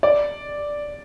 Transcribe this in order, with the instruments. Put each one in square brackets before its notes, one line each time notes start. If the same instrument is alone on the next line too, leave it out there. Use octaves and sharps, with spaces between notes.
[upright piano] D5